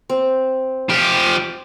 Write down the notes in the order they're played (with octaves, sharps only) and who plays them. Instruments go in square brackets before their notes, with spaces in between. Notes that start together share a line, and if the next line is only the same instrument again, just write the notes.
[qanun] C4
[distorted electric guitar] F3 G4